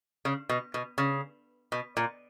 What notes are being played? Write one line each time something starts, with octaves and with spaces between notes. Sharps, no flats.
C#3
B2
B2
C#3
B2
A#2